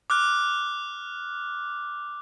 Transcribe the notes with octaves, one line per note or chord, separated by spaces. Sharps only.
D6 F6 F#6